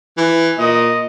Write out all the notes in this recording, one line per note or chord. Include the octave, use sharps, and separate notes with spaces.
E3
A#2 D#5